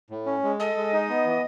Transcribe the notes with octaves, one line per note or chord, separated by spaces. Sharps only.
A2
C#4
G#3
A4 D#5
G#3
D#4
B3
E3